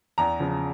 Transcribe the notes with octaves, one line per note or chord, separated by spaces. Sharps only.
E2 A#5
C#3 F3